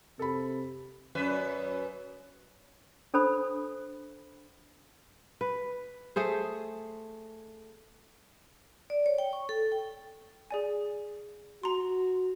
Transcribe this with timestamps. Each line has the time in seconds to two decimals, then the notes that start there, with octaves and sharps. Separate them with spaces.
0.19 C3 A4 B5
1.15 F#2 B4 E5
3.14 D4 A4 C5 B5 D#6
5.41 B4
6.16 A3 G#4 C5
8.90 D5
9.06 C#5
9.18 G5
9.33 C#6
9.49 A4
9.72 G5
10.51 G#4 D5 G#5
11.63 F#4 A#5 C6